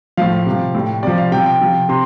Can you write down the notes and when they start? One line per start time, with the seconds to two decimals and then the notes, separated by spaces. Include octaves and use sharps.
0.17 A2 F3 F5
0.46 C3 F3
0.75 A2 G3
1.03 C3 F3 D5
1.18 F5
1.31 C3 F3 G5
1.46 G5
1.61 C3 F3
1.89 C3 C6